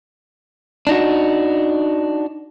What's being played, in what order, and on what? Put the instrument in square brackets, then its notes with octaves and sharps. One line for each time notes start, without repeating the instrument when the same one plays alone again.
[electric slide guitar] D4 D#4 F#4